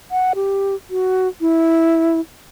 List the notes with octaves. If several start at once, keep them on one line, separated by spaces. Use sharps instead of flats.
F#5
G4
F#4
E4